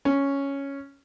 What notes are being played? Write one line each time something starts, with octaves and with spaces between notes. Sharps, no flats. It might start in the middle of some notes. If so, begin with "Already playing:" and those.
C#4